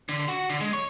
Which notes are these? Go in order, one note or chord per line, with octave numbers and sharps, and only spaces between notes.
D3
F#4
D3
G#3
C#5